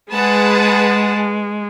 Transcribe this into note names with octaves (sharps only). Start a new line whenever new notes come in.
G#3 G#4 B4 F#5 A5